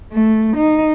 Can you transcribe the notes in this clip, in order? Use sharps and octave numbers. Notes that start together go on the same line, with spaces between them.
A3
D#4